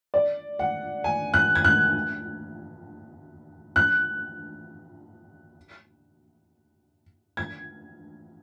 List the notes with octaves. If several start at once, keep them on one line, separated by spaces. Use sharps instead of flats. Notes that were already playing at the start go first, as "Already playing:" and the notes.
D5
F#5
G#5
F#6
G#6
F#6
F#6
G#6